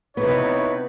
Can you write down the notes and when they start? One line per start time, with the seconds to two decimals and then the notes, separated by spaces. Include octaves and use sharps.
0.17 C3 B3 D#4 E4 B4 C#5